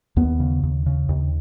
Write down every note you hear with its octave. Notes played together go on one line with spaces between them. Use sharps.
D#2 B3
C#3
D#2
C#3
D#2